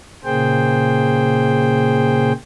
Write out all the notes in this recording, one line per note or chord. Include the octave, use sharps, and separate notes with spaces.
A#2 C#3 A#3 G#4 C5 G5